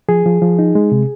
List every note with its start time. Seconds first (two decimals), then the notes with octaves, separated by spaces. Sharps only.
0.09 F3 G#4
0.26 F3
0.42 F3
0.59 D#4
0.75 G#3
0.92 C3